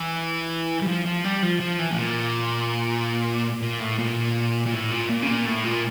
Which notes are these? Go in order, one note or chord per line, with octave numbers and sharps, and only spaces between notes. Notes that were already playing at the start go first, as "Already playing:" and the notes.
Already playing: E3
G3
F3
F3
G3
F3
F3
E3
A2
A#2
A#2
A2
A#2
A#2
A2
A#2
A#2
C#3
A#2
A2
A#2